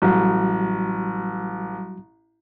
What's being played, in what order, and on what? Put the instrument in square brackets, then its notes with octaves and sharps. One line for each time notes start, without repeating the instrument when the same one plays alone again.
[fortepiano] A1 [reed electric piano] F#3 G3 F#4